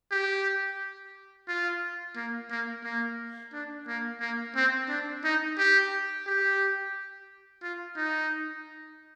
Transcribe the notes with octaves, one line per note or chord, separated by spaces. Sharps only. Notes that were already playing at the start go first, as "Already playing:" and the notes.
G4
F4
A#3
A#3
A#3
D4
A#3
A#3
C4
D4
D#4
G4
G4
F4
D#4